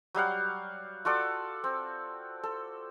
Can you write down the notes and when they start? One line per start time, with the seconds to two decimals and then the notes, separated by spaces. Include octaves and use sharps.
0.15 F#3 G3 F5 F#5
1.05 F4 F#4 A4 D5
1.64 C4
2.43 A4